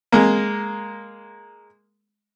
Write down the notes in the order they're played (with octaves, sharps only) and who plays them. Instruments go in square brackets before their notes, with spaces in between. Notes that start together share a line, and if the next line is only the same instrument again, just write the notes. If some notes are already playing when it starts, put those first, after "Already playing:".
[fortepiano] G#3 A#3